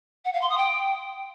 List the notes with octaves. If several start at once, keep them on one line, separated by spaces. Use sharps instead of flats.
F#5
F5
C6
D#6
G5